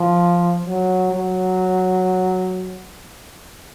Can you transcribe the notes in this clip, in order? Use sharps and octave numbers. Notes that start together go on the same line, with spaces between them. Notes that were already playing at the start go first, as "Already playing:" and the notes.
Already playing: F3
F#3
F#3